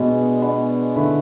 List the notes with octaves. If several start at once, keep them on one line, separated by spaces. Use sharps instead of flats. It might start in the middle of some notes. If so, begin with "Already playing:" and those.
Already playing: B2 G#3 B3 D4 G#4
G#3 B3 D4 G#4
D3 A3 E4 B4